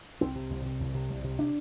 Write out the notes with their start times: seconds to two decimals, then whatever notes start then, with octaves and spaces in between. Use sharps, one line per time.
0.21 C2 C4
0.35 C3
0.50 C2
0.66 C3
0.80 C2
0.95 C3
1.09 C2
1.24 C3
1.39 D4